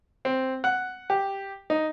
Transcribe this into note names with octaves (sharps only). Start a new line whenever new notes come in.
C4
F#5
G4
D#4